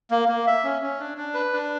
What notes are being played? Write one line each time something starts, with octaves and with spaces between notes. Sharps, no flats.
A#3
A#3
E5
C#4
C#4
D4
D4
B4
D4